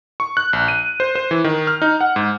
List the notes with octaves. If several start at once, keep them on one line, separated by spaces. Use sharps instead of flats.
C#6
F#6
A#1
D#7
C5
C5
E3
D#3
F6
D#4
F#5
G#2